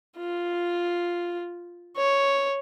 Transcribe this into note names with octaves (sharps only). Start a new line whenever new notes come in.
F4
C#5